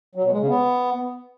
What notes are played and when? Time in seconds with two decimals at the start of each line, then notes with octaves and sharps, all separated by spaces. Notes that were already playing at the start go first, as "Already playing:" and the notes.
0.15 F#3
0.24 B2
0.32 G#3
0.40 C#3
0.48 B3